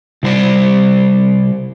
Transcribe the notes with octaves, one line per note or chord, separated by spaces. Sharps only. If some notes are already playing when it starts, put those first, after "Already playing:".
C3 G3 E4 C5 D5